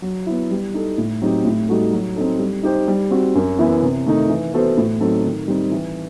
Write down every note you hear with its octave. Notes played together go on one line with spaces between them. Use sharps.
F#3
B3 E4
G3
D#4 A4
A2
F#3 C4 D#4 G4
A2
G3 D#4 F#4 A4
F#3
C4 D#4 A4
G3
D#4 G4 C5
G3
C4 F#4
F#2
E3 B3 E4
C3
D#3 A3 D#4
E3
B3 F#4 A4 C5
A2
F#3 C4 D#4 A4
D#3
G3 C4 D#4
E3